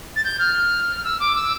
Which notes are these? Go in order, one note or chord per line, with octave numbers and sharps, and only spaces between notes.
A6
G6
F6
F6
E6
D6
E6